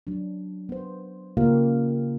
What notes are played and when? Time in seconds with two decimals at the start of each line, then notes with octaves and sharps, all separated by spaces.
0.07 F#3 D4
0.69 B3 C5
1.37 C#3 A#3 F4 G4 A#4 F5